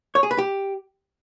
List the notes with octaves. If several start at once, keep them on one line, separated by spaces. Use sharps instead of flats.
C#5
G#4
B4
G4